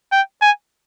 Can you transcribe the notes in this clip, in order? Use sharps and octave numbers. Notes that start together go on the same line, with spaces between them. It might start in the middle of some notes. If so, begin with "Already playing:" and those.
G5
G#5